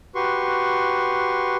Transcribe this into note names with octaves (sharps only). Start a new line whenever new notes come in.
F#4 G4 B4 C6 C#6